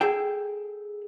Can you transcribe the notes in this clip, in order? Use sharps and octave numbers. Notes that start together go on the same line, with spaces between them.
G#4 A4 G5